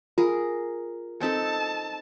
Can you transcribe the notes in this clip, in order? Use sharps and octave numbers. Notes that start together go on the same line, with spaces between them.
F4 G#4 A#4
C4 D#4 A4 A5